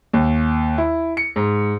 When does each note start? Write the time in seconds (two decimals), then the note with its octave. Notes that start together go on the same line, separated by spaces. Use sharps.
0.13 D#2
0.78 E4
1.17 C#7
1.36 G#2